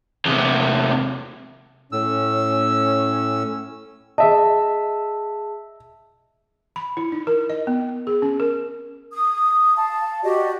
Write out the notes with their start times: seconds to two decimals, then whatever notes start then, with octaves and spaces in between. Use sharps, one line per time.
0.26 E2 C3
1.92 A2 C#4 E6
4.18 G#4 D#5 E5 A5
6.76 B5
6.97 E4
7.12 D#4
7.27 A#4
7.50 D#5
7.67 B3
8.07 G#4
8.22 C#4
8.40 A#4
9.13 D#6
9.77 F5 A5
10.23 F#4 G4 D5 D#5